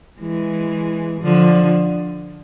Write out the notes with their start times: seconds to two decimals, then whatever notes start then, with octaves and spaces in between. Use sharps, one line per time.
0.21 E3 G#3
1.22 D3 F3